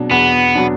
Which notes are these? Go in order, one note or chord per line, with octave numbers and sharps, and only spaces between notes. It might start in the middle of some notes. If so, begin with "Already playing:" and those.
Already playing: B2 F#3 D4
E2 B3
B2 F#3 D4